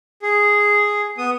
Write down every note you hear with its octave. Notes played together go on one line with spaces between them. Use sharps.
G#4
B3 D#6